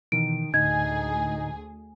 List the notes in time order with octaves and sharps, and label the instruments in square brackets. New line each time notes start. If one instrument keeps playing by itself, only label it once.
[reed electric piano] B2 E3 [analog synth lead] D#3 [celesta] D7
[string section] D2 G#4 [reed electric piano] A2 D3 [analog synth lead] D#4 [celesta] G#6